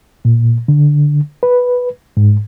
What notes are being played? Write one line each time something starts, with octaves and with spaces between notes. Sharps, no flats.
A#2
D3
B4
G#2